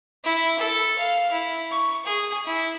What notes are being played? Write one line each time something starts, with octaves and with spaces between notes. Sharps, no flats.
E4
A4
F5
E4
C#6
G#4
E4